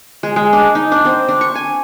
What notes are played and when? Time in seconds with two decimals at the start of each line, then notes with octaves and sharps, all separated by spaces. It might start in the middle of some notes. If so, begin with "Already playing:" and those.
0.23 G#3
0.36 G#3
0.53 D4
0.75 D#4
0.92 D4
1.05 C4
1.29 D4
1.41 C#6
1.55 G#5